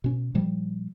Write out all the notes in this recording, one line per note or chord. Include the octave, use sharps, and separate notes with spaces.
B2 C#4
A#2 F3 G3